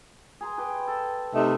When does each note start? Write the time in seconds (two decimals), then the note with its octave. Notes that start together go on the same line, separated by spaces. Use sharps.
0.41 G#4 A#5 C6
0.58 G4 B4 C6
0.88 A4
1.34 C3 A3 D#4